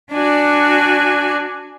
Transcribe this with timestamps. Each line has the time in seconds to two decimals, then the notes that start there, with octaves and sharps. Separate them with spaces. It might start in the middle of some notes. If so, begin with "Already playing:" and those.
0.12 D4 F#4 D5 G#5